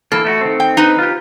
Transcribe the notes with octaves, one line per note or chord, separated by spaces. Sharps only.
E3 A#3 A4
A3 E4 F#4
D#3 C4
G5
D#4 B4
F4 G4